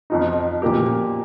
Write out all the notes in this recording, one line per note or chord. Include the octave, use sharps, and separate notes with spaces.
F2 F3 D#4
A#2 F3 A#3 G4